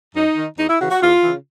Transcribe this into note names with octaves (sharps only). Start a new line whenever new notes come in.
F#2 D#4
D#3
E2 D#4
E4
C#3 E3 F#4
F#4
E2 F4
C#3 E3